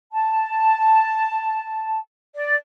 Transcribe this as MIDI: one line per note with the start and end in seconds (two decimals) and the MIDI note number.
0.13 1.98 81
2.35 2.54 74